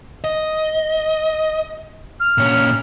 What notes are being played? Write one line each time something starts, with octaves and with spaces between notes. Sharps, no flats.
D#5
F6
A#2 C#4